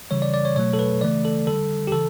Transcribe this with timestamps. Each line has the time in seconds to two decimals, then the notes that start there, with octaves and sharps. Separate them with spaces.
0.11 C#3 E3 G3 C#5
0.22 D5
0.34 D5
0.45 C#5
0.56 B2 F#3 A3 C#5
0.73 A4
0.79 B4
1.01 C#3 E3 A3 D5
1.25 A4
1.47 D3 G3 A4
1.87 G4
1.92 C#3 E3 A4